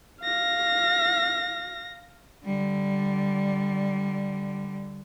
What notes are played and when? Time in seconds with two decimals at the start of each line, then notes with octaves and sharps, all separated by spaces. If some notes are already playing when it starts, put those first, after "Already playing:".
0.22 F5 A#6
2.45 D3 G3